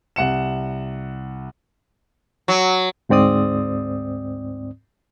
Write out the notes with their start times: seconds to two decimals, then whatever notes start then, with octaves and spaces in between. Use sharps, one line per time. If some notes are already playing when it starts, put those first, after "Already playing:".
0.16 C2 F#5 C#7 E7
2.48 F#3
3.09 D2 G#2 C4 D5 D#6